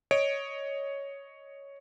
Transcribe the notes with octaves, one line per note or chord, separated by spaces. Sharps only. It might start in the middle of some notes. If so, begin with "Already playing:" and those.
C#5 D#5 D7